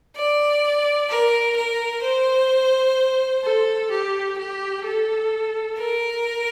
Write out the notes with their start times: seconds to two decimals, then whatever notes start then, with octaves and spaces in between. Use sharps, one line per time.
0.16 D5
1.09 A#4
1.56 A#4
2.03 C5
3.43 A4
3.91 G4
4.37 G4
4.85 A4
5.78 A#4